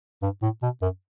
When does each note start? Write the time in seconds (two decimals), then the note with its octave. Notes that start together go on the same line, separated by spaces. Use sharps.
0.22 G2
0.42 A2
0.62 B2
0.82 F#2